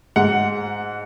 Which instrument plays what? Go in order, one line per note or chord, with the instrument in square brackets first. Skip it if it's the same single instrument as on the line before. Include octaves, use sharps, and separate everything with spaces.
[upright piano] G#2 F#5